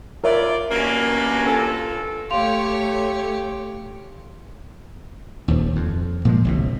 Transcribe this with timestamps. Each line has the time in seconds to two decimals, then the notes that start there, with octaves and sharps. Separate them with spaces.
0.24 F4 A#4 B4 C#5 D5 E5
0.71 G2 B2 E3 F#3 A#3 C#4
1.46 F4 A4 G#5
2.30 A3 G4 C#5 F5 C6 F7
5.48 D#1 D#2
5.76 F2
6.25 A#2 F3 G#3
6.44 G1 C2 B2